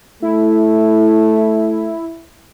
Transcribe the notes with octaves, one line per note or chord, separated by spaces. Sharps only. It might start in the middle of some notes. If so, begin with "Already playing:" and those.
A3 E4